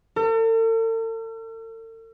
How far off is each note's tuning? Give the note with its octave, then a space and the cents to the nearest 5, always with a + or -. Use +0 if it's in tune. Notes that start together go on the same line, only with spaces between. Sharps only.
A4 +45